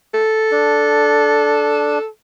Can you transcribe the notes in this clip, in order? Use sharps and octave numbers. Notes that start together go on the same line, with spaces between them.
A4
D4